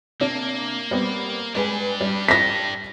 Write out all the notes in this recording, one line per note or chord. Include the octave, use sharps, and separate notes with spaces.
C3 A#3 D4
G3 B3 C4
G#3 D4 G4 B4 G#5
G3
A#6 B6